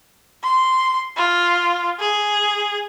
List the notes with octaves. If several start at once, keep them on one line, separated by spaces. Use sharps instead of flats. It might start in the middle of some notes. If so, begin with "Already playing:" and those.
C6
F4
G#4